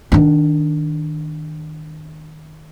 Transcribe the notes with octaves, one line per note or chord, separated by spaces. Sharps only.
D#3 D4